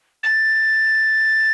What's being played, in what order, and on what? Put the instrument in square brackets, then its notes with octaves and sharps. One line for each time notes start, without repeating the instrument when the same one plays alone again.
[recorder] A6